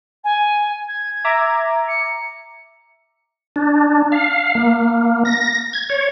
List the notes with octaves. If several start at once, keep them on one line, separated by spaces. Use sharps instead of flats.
G#5
G#6
E5 A#5 D6
C#7
D4
F5
A#3
A#6
G#6
C#5